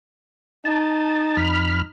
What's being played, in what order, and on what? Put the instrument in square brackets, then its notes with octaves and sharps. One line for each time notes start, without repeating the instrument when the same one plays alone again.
[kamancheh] D#4 [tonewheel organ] A5
[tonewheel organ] F2 B5 F6